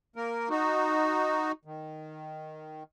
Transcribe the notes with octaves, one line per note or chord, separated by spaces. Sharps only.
A#3 A#4
D#4 F#4
D#3